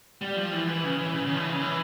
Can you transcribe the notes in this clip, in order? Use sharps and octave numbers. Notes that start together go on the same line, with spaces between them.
G3
F3
E3
E3
C#3
E3
C#3
C#3
F3
E3
C#3
E3